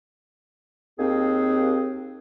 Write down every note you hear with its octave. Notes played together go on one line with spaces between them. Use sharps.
D#2 C4 G#4